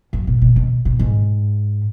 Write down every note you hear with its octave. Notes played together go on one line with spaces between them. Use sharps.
F#2
B2
B2
B2
B2
G#2